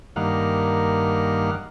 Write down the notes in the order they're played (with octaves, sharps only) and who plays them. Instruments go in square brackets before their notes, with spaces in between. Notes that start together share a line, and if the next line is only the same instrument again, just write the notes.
[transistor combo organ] G2 D#3 A#3 F5 F#5